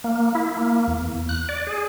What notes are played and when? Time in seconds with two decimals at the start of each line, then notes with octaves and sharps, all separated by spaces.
0.04 A#3
0.35 E4
0.57 A#3
0.87 E2
1.29 F#6
1.49 D5
1.67 G#4